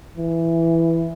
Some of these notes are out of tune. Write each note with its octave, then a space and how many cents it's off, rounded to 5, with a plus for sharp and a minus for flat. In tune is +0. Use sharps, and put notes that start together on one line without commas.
E3 +5